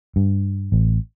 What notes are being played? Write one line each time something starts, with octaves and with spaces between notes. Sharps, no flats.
G2
A1